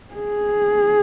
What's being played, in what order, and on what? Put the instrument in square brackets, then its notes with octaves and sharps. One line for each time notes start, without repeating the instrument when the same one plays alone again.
[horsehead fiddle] G#4